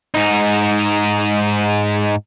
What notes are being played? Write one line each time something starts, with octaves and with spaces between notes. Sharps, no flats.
G#2 D#4